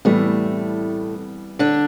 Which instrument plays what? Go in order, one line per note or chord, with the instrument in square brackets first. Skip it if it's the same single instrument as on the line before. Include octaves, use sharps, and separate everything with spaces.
[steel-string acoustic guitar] A2 A3 [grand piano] E3 G3 B3
[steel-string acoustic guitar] D3 D4